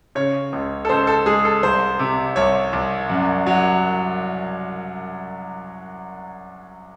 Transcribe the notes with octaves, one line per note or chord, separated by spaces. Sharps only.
C#3 C#5
C#2
A4
C#2 C5
A4
G#3 G#4
A4
C2 C5
C3
C2 C#5
C2
F#2
F#3